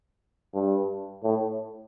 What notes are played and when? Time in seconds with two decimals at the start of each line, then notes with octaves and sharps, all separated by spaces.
0.54 G2
1.24 A2